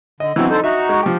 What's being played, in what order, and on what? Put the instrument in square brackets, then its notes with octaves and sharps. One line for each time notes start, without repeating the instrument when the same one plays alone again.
[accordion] D3 [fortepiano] D#5
[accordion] B2 [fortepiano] E3 F#3 C4
[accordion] D3 A4 C5 [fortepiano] D#4
[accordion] D#4 F#4 [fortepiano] E5
[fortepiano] G#3 C#6
F3 G4